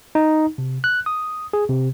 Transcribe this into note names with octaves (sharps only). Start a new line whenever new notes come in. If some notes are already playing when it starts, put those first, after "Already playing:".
D#4
C3
F#6
D#6
G#4
C3